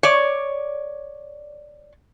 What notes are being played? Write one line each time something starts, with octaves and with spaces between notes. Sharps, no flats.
C#5 D5